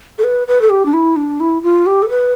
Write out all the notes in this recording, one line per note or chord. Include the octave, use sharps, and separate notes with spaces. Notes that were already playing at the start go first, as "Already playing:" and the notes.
A4
B4
B4
A4
G4
D4
E4
D4
E4
F4
G4
A4
B4